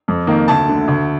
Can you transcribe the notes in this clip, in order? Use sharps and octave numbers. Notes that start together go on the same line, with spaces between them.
F2
D#3 A#3
D2 A5
D3 A3
D2